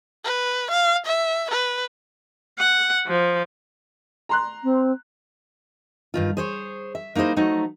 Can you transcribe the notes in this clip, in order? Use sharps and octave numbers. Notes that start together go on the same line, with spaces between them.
B4
F5
E5
B4
F#5
F3
A#5 C6 F#6
C4
G2 D#3 F4
G#4 C5 C#5
E5
A#3 D#4 E4 G#4 C5
F3 F#3 A3 D#4